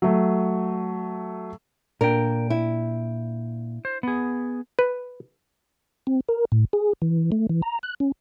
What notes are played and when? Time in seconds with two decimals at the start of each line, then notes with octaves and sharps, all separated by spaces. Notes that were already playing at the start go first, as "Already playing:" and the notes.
0.02 F#3 A3
2.01 A#2 D4 A#4 G5
2.50 E4
3.85 C5
4.03 B3 G#4
4.79 B4
6.07 C4
6.29 A#4
6.52 A2
6.73 G#4
7.02 E3
7.32 A3
7.49 E3
7.62 A#5
7.83 F#6
8.00 C#4